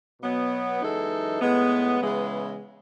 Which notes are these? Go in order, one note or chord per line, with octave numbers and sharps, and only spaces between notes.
B2 F#3 B3
F#2 E3 G#3 D#4 A4
A2 G#3 B3
C#3 E3 G#3 B3